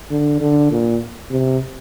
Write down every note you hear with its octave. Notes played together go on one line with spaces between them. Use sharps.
D3
D3
A#2
C3